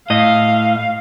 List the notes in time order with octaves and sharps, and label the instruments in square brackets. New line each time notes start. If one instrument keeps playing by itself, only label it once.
[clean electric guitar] A2 D#5 [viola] F5